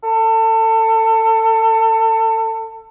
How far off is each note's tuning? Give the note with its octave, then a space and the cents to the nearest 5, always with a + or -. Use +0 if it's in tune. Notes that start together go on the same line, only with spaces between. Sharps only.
A4 +30